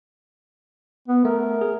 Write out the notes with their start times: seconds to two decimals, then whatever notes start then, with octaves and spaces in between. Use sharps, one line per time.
1.08 B3
1.25 A3 A#4
1.61 G#4